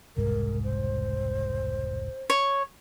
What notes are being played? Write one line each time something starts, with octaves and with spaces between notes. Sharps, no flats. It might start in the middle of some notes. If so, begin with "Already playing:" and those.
E1 C2 G#2 A#4
C5
C#5